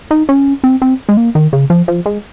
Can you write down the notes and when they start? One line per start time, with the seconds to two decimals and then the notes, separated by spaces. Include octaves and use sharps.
0.11 D#4
0.29 C#4
0.64 C4
0.82 C4
1.09 G#3
1.17 A#3
1.35 D#3
1.53 C#3
1.70 F3
1.88 F3
2.06 G#3